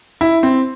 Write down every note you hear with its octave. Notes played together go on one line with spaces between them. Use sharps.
E4
C4